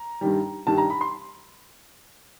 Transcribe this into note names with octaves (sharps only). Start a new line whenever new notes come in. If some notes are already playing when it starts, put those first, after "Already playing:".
Already playing: A#5
G2 D#3 G3
G2 D#3 G3 A5
A#5
B5
C6